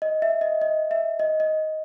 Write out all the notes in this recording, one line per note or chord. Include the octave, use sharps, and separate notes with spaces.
D#5
E5
D#5
D#5
E5
D#5
D#5